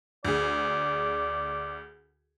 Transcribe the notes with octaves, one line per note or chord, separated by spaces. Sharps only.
D2 G#4 D5